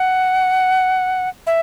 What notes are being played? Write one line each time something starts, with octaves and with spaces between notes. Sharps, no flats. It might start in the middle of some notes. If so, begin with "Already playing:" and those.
Already playing: F#5
E5